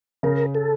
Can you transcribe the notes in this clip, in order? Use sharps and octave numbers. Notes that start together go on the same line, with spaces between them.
C#3 A#4
A4